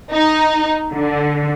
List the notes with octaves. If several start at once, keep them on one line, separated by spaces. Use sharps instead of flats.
D#4
D3